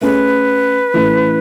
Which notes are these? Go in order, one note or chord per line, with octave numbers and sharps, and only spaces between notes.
A3 C#4 G#4 B4
A2 E3 A3 C#4